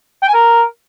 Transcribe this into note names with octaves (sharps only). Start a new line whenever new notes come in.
G5
G#5
A#4